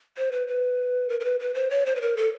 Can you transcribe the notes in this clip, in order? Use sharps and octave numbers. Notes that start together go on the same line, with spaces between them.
C5
B4
B4
A#4
A#4
B4
B4
C5
C#5
C5
B4
A#4
A4